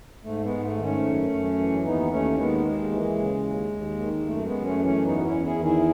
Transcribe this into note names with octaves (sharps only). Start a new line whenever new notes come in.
G#2 A3
G#3 B3
G#2
A3
D#3
A3 C#4
F#2
F#2
E3
D#2 B3 D#4
D#2 A3 C#4
D#3 G#3 B3
D#2 G#3
E3
C#3
D#2
D#2
D#3
F#2 A3
G#3 B3
F#2
A3 C#4
E3
A3 C#4
E2 B3 D#4
F#4
C#4 E4
E2
E4 G#4
D#3
E4 G#4